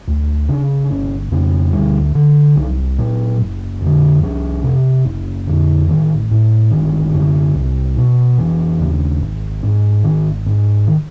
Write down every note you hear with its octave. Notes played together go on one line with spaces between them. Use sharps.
D2
C#3 D4
D4
G1 C#4
F2 C#3
D2 G3
D3
C2 F#3
A#2 F#3
F#1
F2 D3
C2 F3
C3
F#1
F2 D3
A1 D#3
A2
G1 D#3
F#2 D3
C2
B2
F1 E3
D#2 C#3
G#1
G#2
G#1 D#3
G#2
D#3